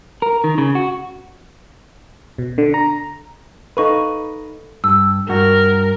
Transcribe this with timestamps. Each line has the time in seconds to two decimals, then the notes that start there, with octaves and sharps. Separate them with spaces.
0.22 A#4
0.44 D#3
0.58 C#3
0.75 F#4
2.38 B2
2.58 D3
2.74 A#5
3.77 D#4 A4 B4 F5 C#6
4.84 G2 E6
5.29 G2 F#4 A#4